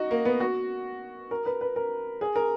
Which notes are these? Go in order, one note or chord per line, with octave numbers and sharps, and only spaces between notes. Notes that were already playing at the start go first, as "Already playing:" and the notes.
Already playing: D#4 F#4
A#3
B3
F#4
A#4
B4
B4
A#4
G#4
A#4